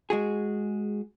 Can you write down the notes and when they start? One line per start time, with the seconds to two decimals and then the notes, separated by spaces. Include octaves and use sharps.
0.10 G#3 F#4 G#4